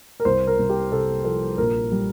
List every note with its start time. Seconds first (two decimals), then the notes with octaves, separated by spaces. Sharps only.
0.20 A#4
0.25 C2 C5
0.47 A#4
0.59 C2
0.69 G4
0.92 C3 A4
1.25 F3 A4
1.58 A#1 A#4
1.92 G3